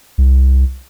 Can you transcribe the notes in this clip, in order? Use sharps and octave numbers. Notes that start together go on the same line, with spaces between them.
C2